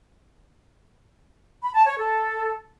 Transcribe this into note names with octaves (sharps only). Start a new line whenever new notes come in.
B5
A5
C#5
A4